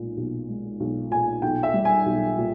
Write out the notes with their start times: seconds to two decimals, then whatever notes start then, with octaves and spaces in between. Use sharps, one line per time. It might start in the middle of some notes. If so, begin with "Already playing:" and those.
Already playing: B1 A#2 G#3
0.17 B1
0.49 G#3
0.80 B1
1.11 A#2 G#5
1.42 B1 G5
1.63 E5
1.74 G3
1.85 G#5
2.06 B1
2.38 A#2